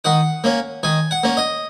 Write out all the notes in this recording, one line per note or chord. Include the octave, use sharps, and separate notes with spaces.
D#3 F#5
A#3 C#4
D#3 G#5
F#5
A#3 C#4
D#5